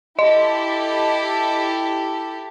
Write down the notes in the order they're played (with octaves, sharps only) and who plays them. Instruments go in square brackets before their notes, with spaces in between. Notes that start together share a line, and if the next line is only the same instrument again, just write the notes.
[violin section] E4 G4 A4 [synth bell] D#5